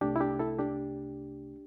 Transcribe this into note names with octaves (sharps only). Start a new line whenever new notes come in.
C2 C3 A3 D4 G4
E4
D4 G4
E4 A4
D4 G4